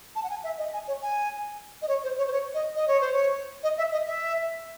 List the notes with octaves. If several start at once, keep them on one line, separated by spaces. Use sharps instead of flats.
A5
F#5
G#5
E5
D#5
G#5
C#5
G#5
D#5
C#5
C5
C#5
C5
C#5
D#5
D#5
C#5
C5
C#5
D#5
E5
D#5
E5